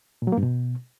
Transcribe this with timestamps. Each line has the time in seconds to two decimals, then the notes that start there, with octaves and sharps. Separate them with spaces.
0.22 A#2
0.27 F#3
0.32 A#3
0.38 G2
0.43 B2